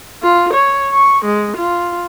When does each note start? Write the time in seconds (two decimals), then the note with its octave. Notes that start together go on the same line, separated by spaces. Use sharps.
0.22 F4
0.53 C#5
0.93 C#6
1.25 G#3
1.57 F4